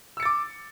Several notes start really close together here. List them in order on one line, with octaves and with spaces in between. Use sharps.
E6 C#7 A6 D6